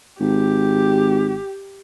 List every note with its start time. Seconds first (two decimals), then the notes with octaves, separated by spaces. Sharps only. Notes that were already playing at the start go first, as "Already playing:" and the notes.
0.20 G#1 G4